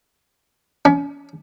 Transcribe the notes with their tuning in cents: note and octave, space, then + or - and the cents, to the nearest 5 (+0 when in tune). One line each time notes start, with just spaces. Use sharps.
C#4 +35